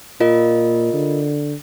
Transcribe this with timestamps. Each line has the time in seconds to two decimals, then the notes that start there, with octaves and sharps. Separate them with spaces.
0.20 A#2 F4 A#4 D#5
0.94 D3